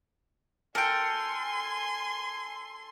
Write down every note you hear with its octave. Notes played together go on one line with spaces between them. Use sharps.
A4 A#4 G5 G#5 C6